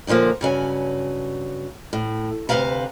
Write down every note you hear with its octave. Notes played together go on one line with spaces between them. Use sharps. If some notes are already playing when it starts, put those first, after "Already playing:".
D#2 A#2 D3 F3 A#3
G2 C#3 F#3 G#5
A2
D2 C3 G3 B4 F5 A#5